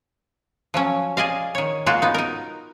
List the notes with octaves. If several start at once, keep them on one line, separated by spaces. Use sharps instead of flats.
F3 F#3 C#4
G#4 D5 D#5 F5
D#3 C#5
G#3 A#3 F4 F#4
B3 D#4
D#4 A#4